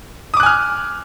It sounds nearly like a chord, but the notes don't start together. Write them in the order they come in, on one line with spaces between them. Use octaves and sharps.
D#6 D6 F#6 G#5 F6